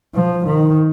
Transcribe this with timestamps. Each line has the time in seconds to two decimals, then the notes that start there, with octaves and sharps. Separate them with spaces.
0.15 F3
0.46 D#3